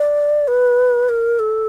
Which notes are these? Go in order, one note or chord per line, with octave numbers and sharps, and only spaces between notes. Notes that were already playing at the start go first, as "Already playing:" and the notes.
Already playing: D5
B4
A#4
A4